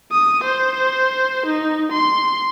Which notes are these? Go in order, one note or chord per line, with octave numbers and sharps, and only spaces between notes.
D#6
C5
D#4
C6